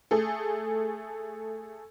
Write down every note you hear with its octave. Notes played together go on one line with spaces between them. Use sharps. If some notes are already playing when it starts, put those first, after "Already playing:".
A3 G#4 A4